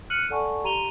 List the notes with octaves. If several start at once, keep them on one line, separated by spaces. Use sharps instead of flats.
F6 F#6 C#7 D#7 F#7
A4 D5 F#5 G#5 A5 C#6
G4 A#5 C6 D#7 F7 G7